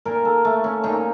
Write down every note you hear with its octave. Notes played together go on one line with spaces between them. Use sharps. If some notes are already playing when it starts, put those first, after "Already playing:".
A#2 A#4
A4
A3
C#4
A#2 D#4